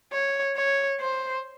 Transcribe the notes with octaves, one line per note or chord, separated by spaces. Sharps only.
C#5
C#5
C5